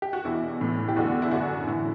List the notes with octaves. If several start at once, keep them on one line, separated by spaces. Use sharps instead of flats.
G4
F#4
E2 B2 E4
A2 E3
G4
E2 D3 F#4
E4
F#2 D3 F#4
A2 E3 E4